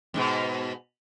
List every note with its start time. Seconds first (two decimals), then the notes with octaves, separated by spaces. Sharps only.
0.14 F2 G#2 B2